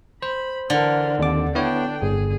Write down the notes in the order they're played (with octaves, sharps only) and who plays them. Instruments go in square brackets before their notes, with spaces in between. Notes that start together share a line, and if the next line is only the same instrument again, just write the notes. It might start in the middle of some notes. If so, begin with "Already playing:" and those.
[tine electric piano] C5 [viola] B5
[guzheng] D3 [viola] E3 A#4
[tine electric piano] D#2 D6 [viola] C4 A4
[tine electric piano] B3 E4 C#5 [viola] D4 G5
[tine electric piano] G1 [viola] G#4